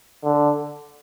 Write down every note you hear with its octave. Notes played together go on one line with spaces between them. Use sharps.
D3